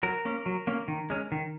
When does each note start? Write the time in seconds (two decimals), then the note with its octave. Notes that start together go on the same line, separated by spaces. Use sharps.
0.03 F#3 A#4
0.25 A#3 C#4
0.46 F#3
0.67 A#3 C#4
0.88 D#3
1.10 G#3 C#4
1.32 D#3